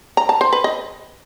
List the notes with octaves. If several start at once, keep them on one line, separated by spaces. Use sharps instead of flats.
A#5
A5
C5
B4
D#5